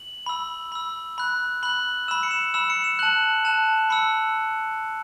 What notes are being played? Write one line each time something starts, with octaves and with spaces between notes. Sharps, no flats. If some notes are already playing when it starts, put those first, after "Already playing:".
Already playing: F#7
B5 E6
B5 E6
B5 F#6
B5 F#6 F#7
B5 E6 E7
C#7
E7
B5 E6 E7
C#7
E7
A5 F#6 F#7
A5 F#6 E7
B5 E6 C#7